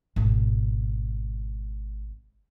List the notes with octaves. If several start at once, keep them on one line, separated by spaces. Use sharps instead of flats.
G#1 B2